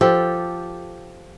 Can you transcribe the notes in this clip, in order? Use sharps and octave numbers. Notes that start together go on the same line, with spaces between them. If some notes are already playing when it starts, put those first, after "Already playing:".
F3 G4 A4